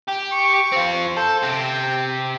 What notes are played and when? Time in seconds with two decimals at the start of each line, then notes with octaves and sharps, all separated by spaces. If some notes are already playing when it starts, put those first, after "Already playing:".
0.08 G4
0.32 C#6
0.72 C4 F4
1.17 A4 C5
1.43 C3 G4 G5